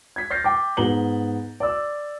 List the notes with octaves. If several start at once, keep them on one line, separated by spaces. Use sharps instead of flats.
G#6 B6
F6 G6 A6 A#6 C7
G5 D6
G#2 B3 A#5 F#7 G7
D5 E6